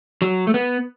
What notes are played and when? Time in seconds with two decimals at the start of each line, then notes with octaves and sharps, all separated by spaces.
0.22 F#3
0.47 A3
0.54 B3